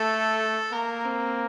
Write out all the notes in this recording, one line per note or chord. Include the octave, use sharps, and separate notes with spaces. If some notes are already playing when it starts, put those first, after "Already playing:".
Already playing: A3 A4
A#3 A#4
C4